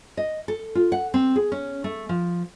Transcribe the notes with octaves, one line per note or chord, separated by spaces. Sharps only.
D#5
A4
F4
F#5
C4
G#4
C#4
A3
F3